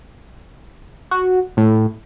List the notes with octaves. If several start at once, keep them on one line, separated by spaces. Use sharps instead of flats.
F#4
A2